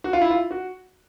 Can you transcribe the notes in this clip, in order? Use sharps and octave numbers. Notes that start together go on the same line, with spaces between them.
F#4
F4
E4
F4
F#4